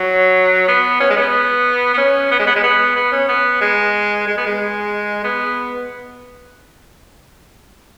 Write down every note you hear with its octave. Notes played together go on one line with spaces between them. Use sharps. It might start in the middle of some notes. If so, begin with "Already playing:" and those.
Already playing: F#3
B3
C#4
G#3
B3
B3
C#4
B3
G#3
B3
G#3
B3
B3
C#4
B3
G#3
G#3
B3
G#3
B3